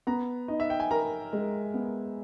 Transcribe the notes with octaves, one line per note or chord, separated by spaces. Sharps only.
B3 A#5
D#4 D#5
E5
G5
G#5
A#4 A#5
G#3
B3